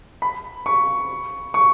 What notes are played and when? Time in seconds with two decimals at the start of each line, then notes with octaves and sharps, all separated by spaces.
0.22 B5
0.66 C#6
1.54 C#6